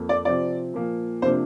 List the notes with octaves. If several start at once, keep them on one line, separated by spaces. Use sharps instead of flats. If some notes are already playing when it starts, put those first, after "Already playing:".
Already playing: F2 A#3
D5
C3 F3 C4 D5
A#2 F3 A#3
C3 F3 A#3 D4 C5